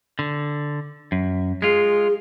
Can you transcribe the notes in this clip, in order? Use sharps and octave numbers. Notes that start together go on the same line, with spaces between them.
D3
F#2
G#3 F4 G#4